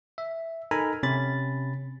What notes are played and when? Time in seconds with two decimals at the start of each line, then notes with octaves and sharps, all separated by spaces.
0.18 E5
0.71 D#4 A4 A#4 G#5 A#5 B5
1.03 C3 C#4 B5 A6